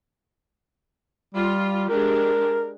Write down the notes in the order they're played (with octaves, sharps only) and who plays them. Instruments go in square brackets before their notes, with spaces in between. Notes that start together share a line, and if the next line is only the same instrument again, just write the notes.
[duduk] G3 [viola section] F4
[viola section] G#3 D4 G4 [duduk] A#4